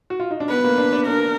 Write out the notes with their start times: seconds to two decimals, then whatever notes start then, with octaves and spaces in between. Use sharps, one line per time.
0.10 F#4
0.20 F4
0.31 D#4
0.40 D4
0.49 B3 B4
0.64 A#3
0.78 D4
0.93 D4
1.07 D4 A#4